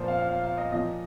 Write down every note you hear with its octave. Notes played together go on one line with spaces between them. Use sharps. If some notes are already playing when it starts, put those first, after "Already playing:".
Already playing: A#2 F3 C5
F5
F5
F5
F5
D#5
A#2 F3 D#5